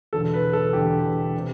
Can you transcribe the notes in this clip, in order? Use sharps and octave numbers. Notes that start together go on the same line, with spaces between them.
E1 E2 D3 A4
B4
A4
E1 E2 D3 G4
C3